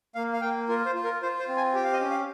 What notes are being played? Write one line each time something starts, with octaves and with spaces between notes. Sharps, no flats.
A#3 F5
F5
A#3 G5
F4 A#4
C5
F4
A#4
F4 C5
C5
C4
G#5
G4 G5
F5
D#5
C#4
F5